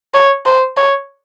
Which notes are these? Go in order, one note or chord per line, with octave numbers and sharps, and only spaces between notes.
C#5
C5
C#5